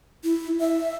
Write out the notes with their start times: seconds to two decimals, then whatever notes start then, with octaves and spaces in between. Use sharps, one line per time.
0.24 E4
0.60 E5